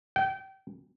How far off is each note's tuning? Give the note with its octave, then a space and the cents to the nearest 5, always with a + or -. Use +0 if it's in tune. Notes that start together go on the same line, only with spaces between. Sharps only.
G5 -30